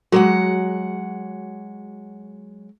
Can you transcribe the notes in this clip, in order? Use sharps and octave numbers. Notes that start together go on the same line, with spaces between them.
F#3 G#3 F#4 G#4 F#5